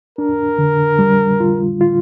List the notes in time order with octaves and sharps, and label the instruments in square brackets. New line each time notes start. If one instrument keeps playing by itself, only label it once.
[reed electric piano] D4 [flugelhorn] A#4
[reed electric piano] D3
G3
F4
F4